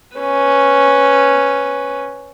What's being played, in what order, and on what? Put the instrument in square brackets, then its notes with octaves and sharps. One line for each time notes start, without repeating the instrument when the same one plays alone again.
[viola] C#4 B4